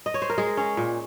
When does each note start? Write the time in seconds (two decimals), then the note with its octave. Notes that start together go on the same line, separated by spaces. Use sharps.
0.06 D#5
0.14 C#5
0.22 C5
0.30 A#4
0.38 G#3 G#4
0.57 C#4
0.77 A#2